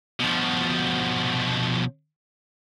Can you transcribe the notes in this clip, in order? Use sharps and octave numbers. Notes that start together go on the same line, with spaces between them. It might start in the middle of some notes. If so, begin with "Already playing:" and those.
B2 F3